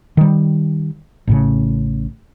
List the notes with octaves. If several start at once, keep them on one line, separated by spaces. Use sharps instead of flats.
D#3 G3
A1 A2 C#3